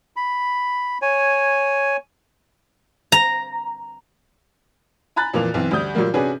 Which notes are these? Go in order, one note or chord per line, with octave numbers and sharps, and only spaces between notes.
B5
C#5 G#5
A#5
G#5 A#5 B5 F#6 A6
F2 A#2 E3 A#3 F5 F7
B1 E3 C4
D2 G3 D#6 G6
A#2 F#3 G3 A#3
C3 C#4 D4 F#4 G#4 B4